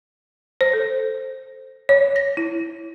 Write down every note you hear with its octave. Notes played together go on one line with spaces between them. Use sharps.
C5
A4
C#5
A#6
E4